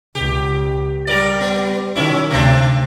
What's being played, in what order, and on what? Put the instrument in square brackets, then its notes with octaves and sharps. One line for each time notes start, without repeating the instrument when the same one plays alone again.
[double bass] C#2 [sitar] G4
[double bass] G3 [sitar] G4 A#4 D5
[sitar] B3
[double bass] D#3 [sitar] F#3 C#4 E4
[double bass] D2 C3 [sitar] A3 C4 D4